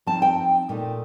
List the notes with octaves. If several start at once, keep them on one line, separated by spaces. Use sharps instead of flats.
F3 C4 D#4 A5
G5
A#2 A3 D#4